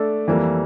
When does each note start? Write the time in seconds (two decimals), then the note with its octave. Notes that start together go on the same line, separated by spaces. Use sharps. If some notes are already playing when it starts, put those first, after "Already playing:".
Already playing: A3 D4 A4 D5
0.27 F2 E3 G3 A#3